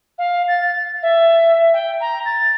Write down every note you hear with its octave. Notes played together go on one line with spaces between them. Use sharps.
F5
A6
E5
G5
A#5
A6